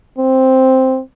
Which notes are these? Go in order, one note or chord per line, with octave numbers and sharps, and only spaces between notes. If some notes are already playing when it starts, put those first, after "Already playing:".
C4